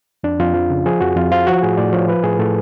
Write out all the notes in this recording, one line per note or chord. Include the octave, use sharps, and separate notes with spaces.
F2 D4
F2 F4
F3
C#3
F3 G#4
F2 F#4
F2 F4
F3 F4
F3 F#4
A2 G#4
A2 D5
F3 C#5
F3 B4
A2 G#4
A2 A4